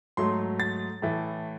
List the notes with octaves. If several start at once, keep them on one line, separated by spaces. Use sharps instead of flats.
G#2 F#3 A3 C6
A6
A2 E3 A3